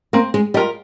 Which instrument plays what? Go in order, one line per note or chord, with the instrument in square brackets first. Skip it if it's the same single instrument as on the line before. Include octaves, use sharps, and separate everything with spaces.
[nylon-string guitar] A#3 [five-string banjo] C4
[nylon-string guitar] G#3
[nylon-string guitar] G3 [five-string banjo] F4 A#4 D#5